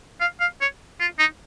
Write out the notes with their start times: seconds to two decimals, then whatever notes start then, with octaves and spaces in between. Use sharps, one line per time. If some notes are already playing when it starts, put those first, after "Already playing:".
0.20 F5
0.40 F5
0.61 C#5
1.00 F4
1.19 D#4